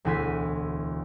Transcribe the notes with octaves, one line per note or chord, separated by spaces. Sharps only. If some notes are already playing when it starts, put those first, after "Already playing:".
E1 D2 E4 G#5 C6 B6